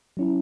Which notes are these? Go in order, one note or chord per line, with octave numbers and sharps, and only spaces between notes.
F#3 C#4 E4